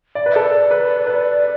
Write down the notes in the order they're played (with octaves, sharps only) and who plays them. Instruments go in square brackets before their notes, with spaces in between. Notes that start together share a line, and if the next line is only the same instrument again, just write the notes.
[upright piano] D5
B4
[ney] E5
[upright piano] A4 [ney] D5
[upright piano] B4
B4